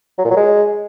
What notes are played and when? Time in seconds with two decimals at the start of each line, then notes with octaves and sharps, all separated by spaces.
0.19 F#3
0.25 A#2
0.30 F#3
0.36 G#3